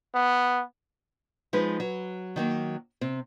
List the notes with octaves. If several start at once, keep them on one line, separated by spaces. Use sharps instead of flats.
B3
F3 G#3 D#4 B4
F#3
D#3 F#3 A#3
C3 C4